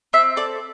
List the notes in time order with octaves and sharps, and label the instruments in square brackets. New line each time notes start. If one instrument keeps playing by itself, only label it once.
[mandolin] C4 E5
A4 D5